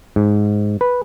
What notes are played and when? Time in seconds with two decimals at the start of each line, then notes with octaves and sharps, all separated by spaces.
0.16 G#2
0.81 B4